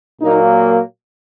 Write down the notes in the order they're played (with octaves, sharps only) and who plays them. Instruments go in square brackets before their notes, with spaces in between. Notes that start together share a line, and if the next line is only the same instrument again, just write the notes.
[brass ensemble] A#2 F#3 A#3 D#4